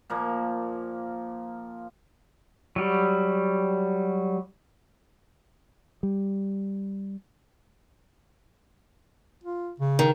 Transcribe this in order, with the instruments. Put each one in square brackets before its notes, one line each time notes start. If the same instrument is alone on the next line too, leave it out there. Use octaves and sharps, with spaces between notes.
[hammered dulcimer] A#2 F3 A#3
[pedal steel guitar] F#3 G3
[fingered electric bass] G3
[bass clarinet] F4
C#3
[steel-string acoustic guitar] D#3